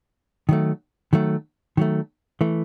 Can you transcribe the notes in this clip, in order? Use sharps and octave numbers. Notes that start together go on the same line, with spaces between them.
D#3 F#3 A3
D#3 F#3 A3
D#3 F#3 A3
E3 A3